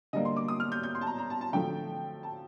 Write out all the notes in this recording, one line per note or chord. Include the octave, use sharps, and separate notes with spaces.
D3 G3 A#3 D#5
C6
D6
D#6
F6
G6
G6
C6
A5
A#5
A#5
A5
A5
D3 F3 A3 G5
A5